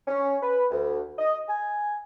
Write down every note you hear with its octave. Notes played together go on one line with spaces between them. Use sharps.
C#4
B4
D2
D#5
G#5